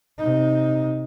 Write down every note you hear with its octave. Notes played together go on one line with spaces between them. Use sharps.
C3 D#4